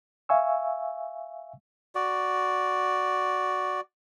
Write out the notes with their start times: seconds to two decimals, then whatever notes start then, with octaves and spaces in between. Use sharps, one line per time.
0.29 E5 F5 G#5 C#6 E6
1.95 F#4 D5